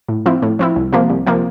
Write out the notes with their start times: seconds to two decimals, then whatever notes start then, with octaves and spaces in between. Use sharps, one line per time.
0.09 A2
0.26 F3 C4 E4
0.42 A2
0.59 F3 C4 E4
0.76 C2
0.93 C3 F3 A#3
1.09 C2
1.26 C3 F3 A#3